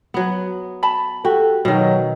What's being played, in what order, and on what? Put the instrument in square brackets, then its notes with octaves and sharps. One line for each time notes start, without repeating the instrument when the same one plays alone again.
[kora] F#3 B3
[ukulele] A5 B5
[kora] F#4 [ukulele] G4 [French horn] A4
[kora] B2 D#3 [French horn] F#3